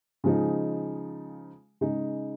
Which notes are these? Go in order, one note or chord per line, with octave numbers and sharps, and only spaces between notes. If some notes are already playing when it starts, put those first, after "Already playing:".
C#3 F3 G#3 D#4
C#3 G#3 D#4